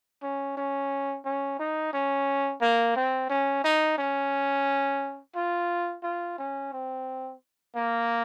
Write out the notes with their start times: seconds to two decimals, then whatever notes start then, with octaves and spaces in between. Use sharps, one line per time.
0.23 C#4
0.57 C#4
1.25 C#4
1.59 D#4
1.93 C#4
2.61 A#3
2.96 C4
3.30 C#4
3.64 D#4
3.98 C#4
5.36 F4
6.03 F4
6.39 C#4
6.73 C4
7.75 A#3